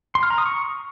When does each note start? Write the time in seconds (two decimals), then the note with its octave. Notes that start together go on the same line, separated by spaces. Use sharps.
0.15 C6
0.23 F6
0.30 A#5
0.38 D#6
0.46 C#6